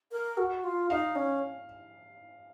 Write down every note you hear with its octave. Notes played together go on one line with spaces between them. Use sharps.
A#4
F#4
F4
D#4 F5
C#4